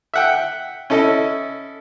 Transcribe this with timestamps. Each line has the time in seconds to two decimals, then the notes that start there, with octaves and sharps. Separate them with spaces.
0.14 E5 F#5 G5
0.90 C#4 E4 A4 D#5